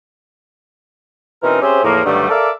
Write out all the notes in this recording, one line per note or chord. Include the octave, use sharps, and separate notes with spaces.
B2 E3 C4 C#4 D#4 A#4
C4 C#4 G4 G#4 C5 E5
E2 A2 F3 A#3
G2 D3 D#3 F#3 G3 A3
A4 A#4 D5 E5 F5 D6